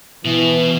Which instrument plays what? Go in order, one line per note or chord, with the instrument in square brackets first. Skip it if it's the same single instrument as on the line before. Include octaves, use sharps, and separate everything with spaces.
[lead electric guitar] B2 [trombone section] E3